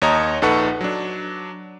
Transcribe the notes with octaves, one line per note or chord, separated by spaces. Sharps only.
D#2 C#5 D#5 A#5
A#1 D#4 A4 B4 F#5 C#6
F#3 D4